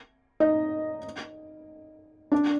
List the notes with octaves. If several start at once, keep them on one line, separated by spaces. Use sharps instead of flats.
D#4 D#5
D4 D5